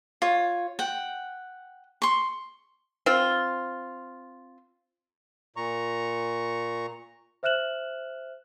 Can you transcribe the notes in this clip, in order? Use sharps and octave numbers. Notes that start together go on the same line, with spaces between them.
F4 C#5
F#5 G5
C6 C#6
C4 F4
A#2 A#5 C#6
C5 E5 F6 F#6 E7 F#7